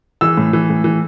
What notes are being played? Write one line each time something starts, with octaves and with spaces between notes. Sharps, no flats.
E3 E6
A2
E3
A2
E3